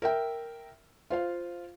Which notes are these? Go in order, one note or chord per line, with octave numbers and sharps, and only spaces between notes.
A#4 E5 G5
F4 C5 F5